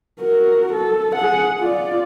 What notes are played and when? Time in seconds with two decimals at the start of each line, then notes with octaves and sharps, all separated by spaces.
0.20 F#4 A#4
0.73 A4
1.15 G#4 F#5
1.61 F4 D5